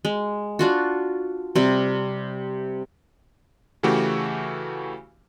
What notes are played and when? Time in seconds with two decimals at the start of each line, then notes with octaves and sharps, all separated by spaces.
0.05 G#3
0.59 D4 F4 F#4
1.55 C3 G3
3.83 C#3 E3 A3 F#4 G4